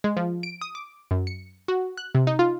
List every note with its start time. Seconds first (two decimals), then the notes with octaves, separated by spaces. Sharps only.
0.04 G#3
0.17 F3
0.43 D7
0.61 D#6
0.75 D6
1.11 F#2
1.27 C#7
1.68 F#4
1.97 F#6
2.15 C3
2.27 D#4
2.39 F4